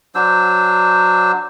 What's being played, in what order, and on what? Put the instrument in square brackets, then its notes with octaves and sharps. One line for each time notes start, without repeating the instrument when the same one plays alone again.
[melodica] F#3 D4 C5 E6